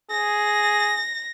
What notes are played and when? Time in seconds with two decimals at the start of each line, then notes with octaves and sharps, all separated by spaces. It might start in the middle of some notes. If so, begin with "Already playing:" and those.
0.11 G#4 A#6